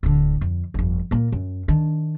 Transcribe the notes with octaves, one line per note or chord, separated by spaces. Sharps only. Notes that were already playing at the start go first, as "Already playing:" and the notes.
D1 D3
F2
G1 F2
A#2 A#3
F#2
D#3 D4